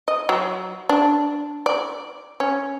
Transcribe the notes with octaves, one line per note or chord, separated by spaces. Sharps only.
D#5
F#3
D4
D5
C#4